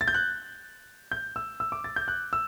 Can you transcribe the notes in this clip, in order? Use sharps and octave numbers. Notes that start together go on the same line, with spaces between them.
A6
G6
F#6
G6
E6
E6
D6
A6
G6
F#6
E6